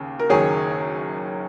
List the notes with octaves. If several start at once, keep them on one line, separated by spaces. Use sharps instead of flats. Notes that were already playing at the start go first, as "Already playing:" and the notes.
Already playing: D#2 C#3
A#4
F#1 F#2 D#3 G#4 C#5